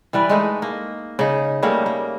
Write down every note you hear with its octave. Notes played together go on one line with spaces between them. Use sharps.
E3 G3 B4 D5
G#3 A3 D#4
A#3
C#3 D#4
C#3 G3 A3 A#3
A#3